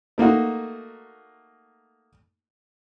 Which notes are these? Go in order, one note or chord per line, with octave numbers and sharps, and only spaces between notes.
A3 A#3 D#4 F#4